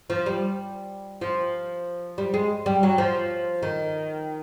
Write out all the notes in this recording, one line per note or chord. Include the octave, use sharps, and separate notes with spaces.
F3
G3
F3
G3
G#3
G3
F#3
F3
D#3